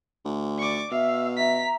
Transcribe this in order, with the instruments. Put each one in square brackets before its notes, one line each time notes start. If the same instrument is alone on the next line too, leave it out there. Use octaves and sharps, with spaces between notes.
[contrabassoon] D2
[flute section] D5 [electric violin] C#6 D6
[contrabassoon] B2 [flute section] E5 E6 [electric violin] F5
[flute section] E5 A#5 [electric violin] B6